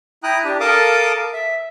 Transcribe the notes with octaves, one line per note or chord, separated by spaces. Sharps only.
E4 G5 A#5 D#6 F#6
D4 G4
A4 A#4 F5 A5 D6 D#6
E5